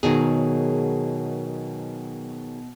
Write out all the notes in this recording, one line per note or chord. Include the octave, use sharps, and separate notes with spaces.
B2 D#3 F#3 G#4